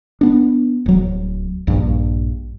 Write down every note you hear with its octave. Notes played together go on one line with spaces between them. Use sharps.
B3 D4
D1 F#3
A#1 G2